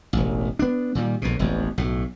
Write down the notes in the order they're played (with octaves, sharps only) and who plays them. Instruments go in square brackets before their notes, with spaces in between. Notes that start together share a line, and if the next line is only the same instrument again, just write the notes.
[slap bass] E1 A1
B3 D4
A#2 D#3 G3
A#1 F2 B2
E1 A1 F2
B1 A2